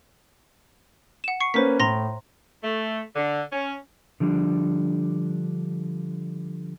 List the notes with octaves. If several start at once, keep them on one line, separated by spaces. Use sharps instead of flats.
F#5 E7
C#6 C7 C#7
A#3 C#4 B4 C5 B6
A2 A#5 C6 A#6
A3
D3
C#4
D3 F3 G3 D4